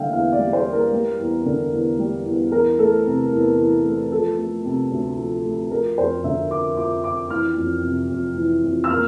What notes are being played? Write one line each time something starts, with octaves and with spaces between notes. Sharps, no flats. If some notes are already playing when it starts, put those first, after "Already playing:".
Already playing: D3 G3 A#3 E5 F5 G5
E2 F5
D5
G3
C5
A#3
A#4
G3
E2
D3
E2
G3
E2
E3 A#4
A3 A4
C3
E2
E3
A3
F3 A4
A3
C3
D2
F3
A3
F3 A#4
F2 C5
D3 E5
F2 D6
F3 D6
F2 D6
E3 F6
F2
C3
F2
E3
F2
E6
A#3 F6